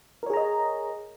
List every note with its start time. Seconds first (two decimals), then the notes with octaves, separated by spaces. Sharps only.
0.23 A#4
0.26 C#5
0.30 G#4
0.33 A#5
0.37 D#5